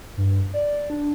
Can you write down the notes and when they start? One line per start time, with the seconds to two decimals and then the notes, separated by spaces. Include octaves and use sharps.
0.17 G2
0.54 D5
0.90 D4